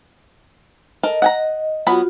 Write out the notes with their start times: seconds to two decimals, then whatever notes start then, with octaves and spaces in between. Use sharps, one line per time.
1.03 A4 A#4 D#5
1.22 F#5 G#5 A#5
1.87 F#3 B3 F4 F#4 B5